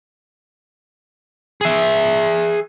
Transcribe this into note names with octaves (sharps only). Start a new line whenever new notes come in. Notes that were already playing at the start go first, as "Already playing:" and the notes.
G#4 E5